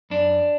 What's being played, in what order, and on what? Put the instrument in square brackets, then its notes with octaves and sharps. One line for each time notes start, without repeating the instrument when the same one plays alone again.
[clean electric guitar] F#2 D4